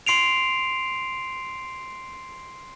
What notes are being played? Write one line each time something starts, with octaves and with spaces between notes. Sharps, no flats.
C6 C7 D7 F7